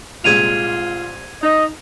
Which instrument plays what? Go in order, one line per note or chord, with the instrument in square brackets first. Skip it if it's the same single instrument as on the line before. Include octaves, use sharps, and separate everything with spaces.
[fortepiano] C2 A#2 G#3 [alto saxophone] F4 [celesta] G#6 D#7 F7
[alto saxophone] D#4 [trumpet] D#5